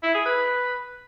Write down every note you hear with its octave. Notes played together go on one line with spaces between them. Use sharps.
E4
G#4
B4